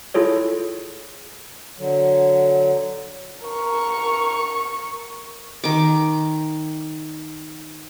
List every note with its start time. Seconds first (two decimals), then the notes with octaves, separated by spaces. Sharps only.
0.14 E4 F4 G#4 A4 C#5
1.78 D3 F#3
3.45 A#4 C#6
5.64 D#3 D6